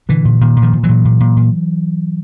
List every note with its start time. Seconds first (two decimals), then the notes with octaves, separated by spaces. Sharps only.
0.09 A#2 D3 E3
0.25 A#2
0.41 A#2 D#3
0.56 A#2
0.62 D#3 F3
0.73 A#2
0.83 E3 F#3
0.89 A#2
1.05 A#2
1.20 A#2
1.36 A#2